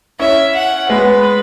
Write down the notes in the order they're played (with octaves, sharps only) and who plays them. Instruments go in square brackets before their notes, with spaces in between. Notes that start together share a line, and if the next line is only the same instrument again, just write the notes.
[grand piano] C#4 E4 [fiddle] E5
[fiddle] F#5
[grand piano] G#3 B3 [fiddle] B4